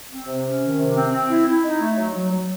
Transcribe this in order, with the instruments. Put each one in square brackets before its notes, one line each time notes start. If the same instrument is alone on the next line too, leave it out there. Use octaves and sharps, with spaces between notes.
[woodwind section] C4
C3
C#4
D#3
C3
C4
C4
E4
E4
D#4
A3
F#3
F#3
F#3